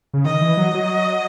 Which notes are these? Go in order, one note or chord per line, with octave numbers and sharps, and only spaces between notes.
C#3
D#3 D#5
E3
F#3
F#3